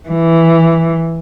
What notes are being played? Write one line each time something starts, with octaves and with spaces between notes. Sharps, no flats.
E3